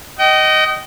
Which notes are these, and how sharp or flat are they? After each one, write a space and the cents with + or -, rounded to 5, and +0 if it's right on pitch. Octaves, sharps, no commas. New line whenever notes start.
D#5 +0 G5 -40